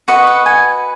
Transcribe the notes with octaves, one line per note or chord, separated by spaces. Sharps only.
F#4 B4 D#5 C#6
F#5
G#5